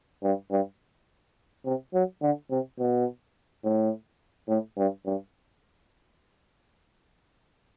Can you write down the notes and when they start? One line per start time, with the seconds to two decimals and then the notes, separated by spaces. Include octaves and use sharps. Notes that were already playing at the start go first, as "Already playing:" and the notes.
0.23 G2
0.51 G2
1.65 C3
1.94 F#3
2.22 D3
2.51 C3
2.79 B2
3.64 A2
4.49 A2
4.78 G2
5.06 G2